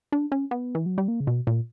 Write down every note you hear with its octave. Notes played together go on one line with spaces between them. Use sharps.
D4
C#4
B3
E3
F#3
G3
A#3
C#3
B2
A#2